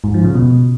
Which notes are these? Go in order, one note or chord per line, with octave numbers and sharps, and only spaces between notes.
G#2
F3
C#3
B2